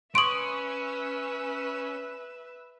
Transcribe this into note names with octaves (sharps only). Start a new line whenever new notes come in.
C#4 B4 E5 C6 C#6 D#6 D7 F#7